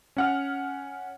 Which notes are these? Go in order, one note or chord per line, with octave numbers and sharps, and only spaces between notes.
C#4 F#5 F6